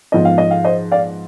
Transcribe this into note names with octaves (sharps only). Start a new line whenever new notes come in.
G#2 F3 B3 D#5
F5
D#5
F5
C5 D#5
D5 F5